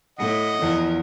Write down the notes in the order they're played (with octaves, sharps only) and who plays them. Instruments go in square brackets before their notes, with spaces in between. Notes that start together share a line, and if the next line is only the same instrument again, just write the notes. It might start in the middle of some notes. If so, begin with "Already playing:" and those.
[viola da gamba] A2 [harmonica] D#5 F#5
[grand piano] E2 [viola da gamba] F3 A#4